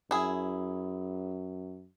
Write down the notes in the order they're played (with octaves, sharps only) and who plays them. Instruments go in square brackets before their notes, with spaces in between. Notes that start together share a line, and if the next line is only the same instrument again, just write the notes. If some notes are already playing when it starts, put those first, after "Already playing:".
[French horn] F#2 [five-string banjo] E4 G#4